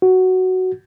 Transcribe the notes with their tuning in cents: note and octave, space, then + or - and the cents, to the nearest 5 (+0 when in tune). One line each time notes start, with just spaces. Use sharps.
F#4 +5